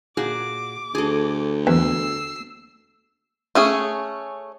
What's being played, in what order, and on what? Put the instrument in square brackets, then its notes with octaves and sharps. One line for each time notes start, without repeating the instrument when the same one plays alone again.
[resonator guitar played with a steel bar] A#2 F#4 G#4 [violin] D6
[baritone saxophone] D2 [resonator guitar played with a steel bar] G#4 A4
[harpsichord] E2 [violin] E6 C7
[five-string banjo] A3 C#4 G#4